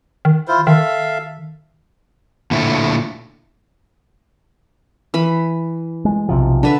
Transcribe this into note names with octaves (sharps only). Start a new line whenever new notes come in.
D#3
E4 F4 C5
D#3 A4 E5 F5
A#2 D3 A3 E4
E3 B5
G#3
B1 C3 F3
D3 D4 B4 E5